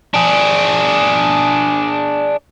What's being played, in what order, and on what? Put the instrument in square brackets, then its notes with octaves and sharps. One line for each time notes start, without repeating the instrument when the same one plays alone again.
[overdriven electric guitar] D4 G#4